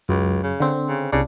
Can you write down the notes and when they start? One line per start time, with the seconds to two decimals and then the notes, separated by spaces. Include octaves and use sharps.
0.09 C#2 F#2
0.43 C#3
0.60 D3 C4
0.89 C#3
1.12 C2 C#3 D4